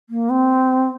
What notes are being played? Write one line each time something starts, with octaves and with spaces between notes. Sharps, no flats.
A#3
C4